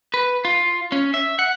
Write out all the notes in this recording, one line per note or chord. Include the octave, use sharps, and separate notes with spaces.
B4
F4
C#4
E5
F#5